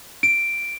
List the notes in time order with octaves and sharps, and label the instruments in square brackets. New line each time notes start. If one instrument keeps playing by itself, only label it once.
[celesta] D7